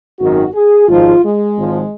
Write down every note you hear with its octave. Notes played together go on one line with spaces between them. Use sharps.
G#1 F#2 D#3 F#4
G#4
G#1 G#2 F3 F4
G#3
G#1 G#2 F3